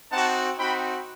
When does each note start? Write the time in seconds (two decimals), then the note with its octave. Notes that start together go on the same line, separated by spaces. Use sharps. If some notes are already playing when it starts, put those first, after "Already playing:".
0.11 C4 D#4 F#4 F#5 A5
0.58 C4 D#4 F#4 G5 B5